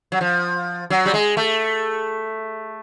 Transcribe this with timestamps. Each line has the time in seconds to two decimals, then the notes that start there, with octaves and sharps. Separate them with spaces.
0.12 F#3
0.21 F3
0.90 F#3
1.05 G3
1.14 G#3
1.37 A3